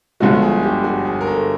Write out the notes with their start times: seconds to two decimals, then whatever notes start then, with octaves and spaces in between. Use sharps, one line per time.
0.20 G1 G2 D3 F3 G#3 F#4
0.42 G#4
0.63 G4
0.84 F#4
1.05 G#4
1.21 A#4
1.27 A4